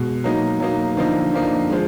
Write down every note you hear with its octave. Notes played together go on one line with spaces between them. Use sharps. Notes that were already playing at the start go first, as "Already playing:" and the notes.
Already playing: B2 G#3
F#3 A#3 D#4
F#3 A#3 D#4
D3 F3 A#3 D#4
D3 F3 A#3 D#4
F3 G#3